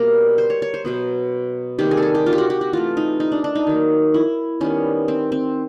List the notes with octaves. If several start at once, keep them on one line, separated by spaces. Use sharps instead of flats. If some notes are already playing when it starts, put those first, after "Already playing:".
Already playing: B2 G3 A#3 A#4
C5
C#5
C#5
C5
B2 F#3 B3
C3 D#3 G3 A#3 G4
G#4
A4
G#4
G4
F4
G4
F#4
G4
F#4
E3 A3 F4
D#4
D#4
D4
D4
D#4
D#3 F#3 A#3
E4
D#3 G3 B3 C#4
C4
C4